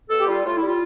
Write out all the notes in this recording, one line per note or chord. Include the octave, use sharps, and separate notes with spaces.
B2 A4
G4
G3 F4
A2 F4
E4
G3 F4